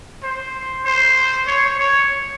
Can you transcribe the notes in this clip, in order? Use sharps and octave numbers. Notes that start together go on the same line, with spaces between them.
C5
C5
C#5
C#5